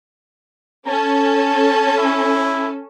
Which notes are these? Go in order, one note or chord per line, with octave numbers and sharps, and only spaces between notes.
C#4 A4 A5
E4